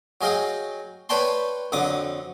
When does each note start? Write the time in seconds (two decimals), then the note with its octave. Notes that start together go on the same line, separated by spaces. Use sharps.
0.21 F#3 G#4 D#5 F5 G5
1.09 B4 C#5 D5 G5 A5 C6
1.72 F2 D3 F#3 D6 D#6